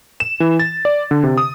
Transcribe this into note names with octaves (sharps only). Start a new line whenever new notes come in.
E7
E3
A6
D5
D3
C3
D#6